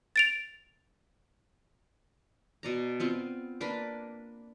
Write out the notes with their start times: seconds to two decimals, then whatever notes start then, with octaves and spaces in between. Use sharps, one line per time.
0.16 A6 D7 F7
2.63 B2 D5 A#5
3.00 B3 C4 F4
3.61 A#3 D4 A#4 B4